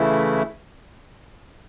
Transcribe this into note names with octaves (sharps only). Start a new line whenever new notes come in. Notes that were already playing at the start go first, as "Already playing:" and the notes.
Already playing: C#3 E3 A3 E4